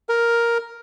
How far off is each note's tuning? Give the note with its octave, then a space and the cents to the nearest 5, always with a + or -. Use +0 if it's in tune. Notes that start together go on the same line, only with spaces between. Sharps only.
A#4 +5